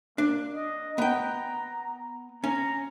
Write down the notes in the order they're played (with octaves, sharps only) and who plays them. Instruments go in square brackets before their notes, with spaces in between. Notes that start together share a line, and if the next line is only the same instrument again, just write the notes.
[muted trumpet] A#3 [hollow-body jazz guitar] D4
[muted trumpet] D#5
[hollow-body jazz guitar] B3 G5 [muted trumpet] A#5
[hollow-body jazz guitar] C#4 [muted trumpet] A#5